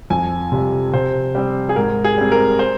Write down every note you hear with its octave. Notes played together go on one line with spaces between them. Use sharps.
F2 G#5
C3 G3
C3 C5
G3 C4
G#4
G#2 A#4
G#4
G3 C4
A#4
C5